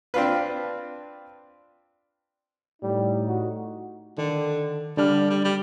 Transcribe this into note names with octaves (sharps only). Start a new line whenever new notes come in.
C4 D4 F4 B4
A2 G3 D#4
F#4
D3 D#3
D3 G3 D4 F6
G3
G3